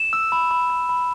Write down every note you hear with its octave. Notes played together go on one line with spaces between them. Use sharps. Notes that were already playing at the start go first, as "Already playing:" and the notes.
Already playing: E7
E6
B5
B5
B5
B5